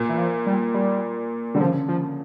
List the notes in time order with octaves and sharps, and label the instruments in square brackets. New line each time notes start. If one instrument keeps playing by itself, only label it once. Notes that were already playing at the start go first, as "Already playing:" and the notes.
Already playing: [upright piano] A#2
[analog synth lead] E3
F3
G3
G3
[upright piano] D3 [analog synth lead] G3
[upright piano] C#3 [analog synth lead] F3
[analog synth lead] F3